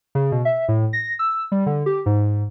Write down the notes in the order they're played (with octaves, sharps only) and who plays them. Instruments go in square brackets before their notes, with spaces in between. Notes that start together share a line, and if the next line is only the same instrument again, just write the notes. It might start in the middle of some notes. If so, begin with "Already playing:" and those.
[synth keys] C#3
B2
E5
A2
A#6
E6
G3
D3
G4
G#2